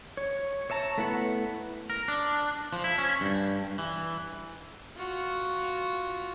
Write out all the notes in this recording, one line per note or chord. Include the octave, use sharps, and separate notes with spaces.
C#5
C#5 E5 A5 A#5
A3 B3 E4 B4 F#5
A#4
D4
F3
E4
C#4
G2
E3
F4 F#4